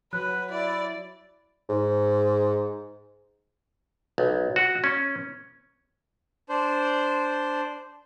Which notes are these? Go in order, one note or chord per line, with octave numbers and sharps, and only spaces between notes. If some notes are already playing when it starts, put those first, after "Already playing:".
F#3 B4 F#6
E4 D5
G#2
B1
F#4
C#4
D4 C5